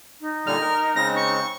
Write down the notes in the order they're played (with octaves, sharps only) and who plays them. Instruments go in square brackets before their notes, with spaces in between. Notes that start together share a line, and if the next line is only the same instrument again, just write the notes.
[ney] D#4
[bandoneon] A#2 D3 G3 [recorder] F6
[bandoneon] A#4
[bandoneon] C#3 G#3 C4 [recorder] A#6
[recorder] C#6